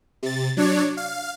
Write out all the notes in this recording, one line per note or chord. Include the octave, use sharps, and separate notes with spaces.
C3 A6
F#3 D4 C#5 D5
F5